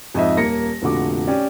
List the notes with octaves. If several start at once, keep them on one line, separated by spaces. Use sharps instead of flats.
F2 G#2 D#5 E5
D#1 A#3 A#6 C#7
F1 A#2 D3 F#4 D6
C#4 G4 D5